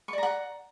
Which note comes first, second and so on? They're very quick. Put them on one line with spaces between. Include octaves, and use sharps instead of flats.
C#6 D5 A#5 F#5